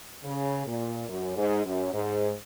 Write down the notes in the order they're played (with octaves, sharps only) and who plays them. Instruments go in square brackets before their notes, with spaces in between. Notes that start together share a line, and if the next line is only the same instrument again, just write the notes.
[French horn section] C#3
A#2
F#2
G#2
F#2
G#2